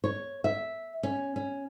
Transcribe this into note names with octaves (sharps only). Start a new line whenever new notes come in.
C#5
E5
C#4
C#4